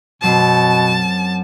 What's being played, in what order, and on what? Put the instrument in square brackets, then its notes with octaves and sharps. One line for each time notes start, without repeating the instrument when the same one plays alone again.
[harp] F#2 F#3 C4 [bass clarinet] B2 [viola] A5